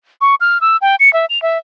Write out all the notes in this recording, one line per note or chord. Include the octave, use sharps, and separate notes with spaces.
C#6
F6
E6
G5
C#7
E5
F7
E5